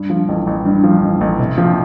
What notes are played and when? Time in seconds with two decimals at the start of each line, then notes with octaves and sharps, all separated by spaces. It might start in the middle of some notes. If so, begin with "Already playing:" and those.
Already playing: G2
0.10 F3
0.29 A1
0.47 A1
0.65 G2
0.84 F3
1.03 A1
1.21 A1
1.39 C3
1.58 F3